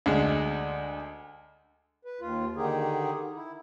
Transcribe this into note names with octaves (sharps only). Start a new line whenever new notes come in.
D2 G#3
B4
D#2 F4
D3 D#3 D#4 G4 G#4
E4